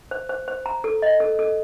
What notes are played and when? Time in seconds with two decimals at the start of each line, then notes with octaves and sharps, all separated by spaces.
0.11 C5
0.29 C5
0.48 C5
0.66 A#5
0.84 A4
1.02 D#5
1.20 A4
1.39 A4